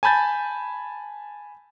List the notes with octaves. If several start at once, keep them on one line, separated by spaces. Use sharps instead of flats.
G#5 A5 B5 G6 A6